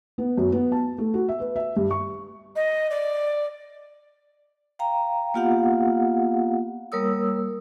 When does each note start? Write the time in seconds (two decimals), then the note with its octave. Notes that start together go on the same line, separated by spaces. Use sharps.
0.18 B3
0.37 F#2
0.52 B3
0.72 A5
0.98 A3
1.14 F#4
1.28 E5
1.40 B4
1.56 E5
1.76 G2
1.91 C#6
2.56 D#5
2.90 D5
4.79 F5 G5 A#5
5.34 A#3 B3 F4 G4 F5 F#5
6.92 G3 A#3 A#4 C#5 D#6 E6